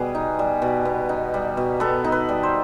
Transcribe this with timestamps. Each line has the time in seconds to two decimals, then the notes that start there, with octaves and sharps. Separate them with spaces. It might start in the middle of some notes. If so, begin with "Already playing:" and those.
Already playing: B2 G3 B3 G#4
0.15 D#4
0.39 G3
0.62 B2
0.85 B3
1.09 D#4
1.34 G3
1.57 B2
1.80 B3 A4
2.04 D#4
2.12 B4
2.29 G3
2.43 C5